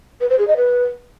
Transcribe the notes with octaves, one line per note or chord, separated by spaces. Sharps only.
B4
C5
G#4
D#5
B4